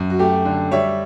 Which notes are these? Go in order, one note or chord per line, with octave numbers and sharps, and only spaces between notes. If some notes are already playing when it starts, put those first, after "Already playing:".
Already playing: F#2
F#4
A3 G4
D3
G3 C#5 E5